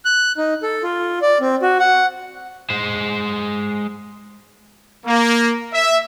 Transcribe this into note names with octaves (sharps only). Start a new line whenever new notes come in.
F#6
D#4
A4
F4
D5
C4
F#4
F#5
G#3 C5
A#3
E5